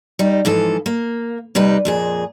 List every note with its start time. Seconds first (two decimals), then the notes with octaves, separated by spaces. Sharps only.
0.19 G3 D#4
0.45 G#2 E3 F3 A4
0.86 A#3
1.55 C3 G3 D#4 B4
1.85 F2 A#2 G#4